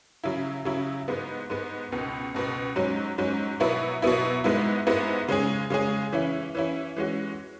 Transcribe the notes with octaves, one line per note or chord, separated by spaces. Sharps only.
C#3 F#3 E4
C#3 F#3 E4
G#2 G#3 B3
G#2 G#3 B3
C#2 B2 B3
C#2 B2 B3
G#2 F#3 C#4
G#2 F#3 C#4
B2 F#3 B3 E4
B2 F#3 B3 E4
G#2 G#3 B3 E4
G#2 G#3 B3 E4
C#3 G#3 C#4 G#4
C#3 G#3 C#4 G#4
E3 C#4 E4
E3 C#4 E4
E3 G#3 C#4 F#4